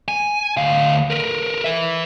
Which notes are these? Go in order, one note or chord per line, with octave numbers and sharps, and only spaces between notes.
G#5
D2 F5
A#4 B4
B4 E5